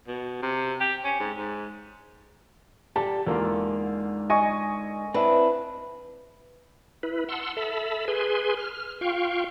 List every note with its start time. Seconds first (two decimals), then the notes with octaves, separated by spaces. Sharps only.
0.08 B2
0.42 C3
0.80 G4
1.04 C#4
1.20 G#2
1.37 G#2
2.96 G4 A4 D5 A5
3.27 E2 G#2 D3 A#3 F4
4.30 D#5 G#5 C#6
5.14 C4 D4 E4 B4
7.03 E4 B4
7.29 F#5 A5 C6 E6
7.56 A4 E5 A5 B5
8.08 G#4 B4 G#5 C6
8.57 F6
9.01 F4 F5 G5 C#6